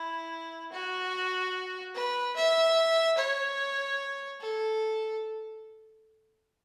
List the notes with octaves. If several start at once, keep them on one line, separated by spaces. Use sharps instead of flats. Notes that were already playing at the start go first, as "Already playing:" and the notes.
Already playing: E4
F#4
B4
E5
C#5
A4